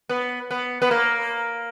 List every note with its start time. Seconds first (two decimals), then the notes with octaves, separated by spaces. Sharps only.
0.09 B3
0.51 B3
0.82 B3
0.91 A#3